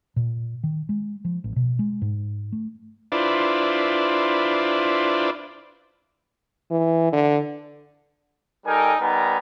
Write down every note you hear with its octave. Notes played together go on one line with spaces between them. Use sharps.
A#2
D#3
G#3
F3
A1
B2
G#3
G#2
A3
D4 E4 F4 B4 C5 D5
E3
D3
G3 D#4 A4 A#4 G5 G#5
G3 B3 D#4 A#4 G#5 A#5